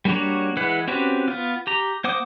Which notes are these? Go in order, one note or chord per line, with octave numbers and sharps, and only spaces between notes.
G3 A#3 D4 F#4 C#5
E3 G#3 B4 F#5
C4 C#4 F#4 G4 B4
B3 F4
G4 A#5
A#3 C5 F#5 D6 D#6